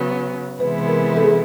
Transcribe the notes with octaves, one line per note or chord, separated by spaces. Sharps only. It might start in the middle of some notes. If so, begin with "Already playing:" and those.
Already playing: C#3 F#3 B3
C3 E3 G#3 B3 E4 B4
A#4
A4
G#4